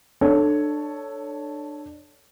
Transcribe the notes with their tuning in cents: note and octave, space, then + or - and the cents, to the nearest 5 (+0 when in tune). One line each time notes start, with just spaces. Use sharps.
D4 +25 A4 +0 C#5 +0